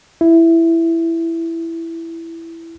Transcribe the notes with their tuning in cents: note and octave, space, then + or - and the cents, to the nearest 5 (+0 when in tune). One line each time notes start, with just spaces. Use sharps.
E4 +5